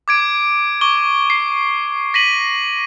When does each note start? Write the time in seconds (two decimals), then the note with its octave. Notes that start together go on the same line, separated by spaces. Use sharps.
0.08 D6 G#6 D7
0.81 C#6 D6 G7
1.30 C7
2.14 A#6 B6 D#7 F#7